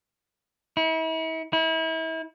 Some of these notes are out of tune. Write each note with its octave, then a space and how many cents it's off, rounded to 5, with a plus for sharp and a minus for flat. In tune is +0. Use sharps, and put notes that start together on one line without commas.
E4 -40
E4 -35